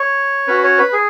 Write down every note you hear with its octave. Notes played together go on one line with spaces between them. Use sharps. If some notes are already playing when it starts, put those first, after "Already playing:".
Already playing: C#5
C#4 F#4 B4
C#5
B4
G#4